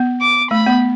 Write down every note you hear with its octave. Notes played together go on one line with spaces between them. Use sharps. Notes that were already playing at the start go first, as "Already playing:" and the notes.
Already playing: B3
D6
A3 B5
B3